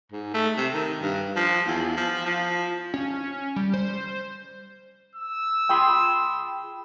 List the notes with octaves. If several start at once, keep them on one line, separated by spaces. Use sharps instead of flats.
G#2
A3
C3
D#3
G2
F3
E2
F3
F3
C#4
G3
C5
E6
F4 G#4 G5 B5 C6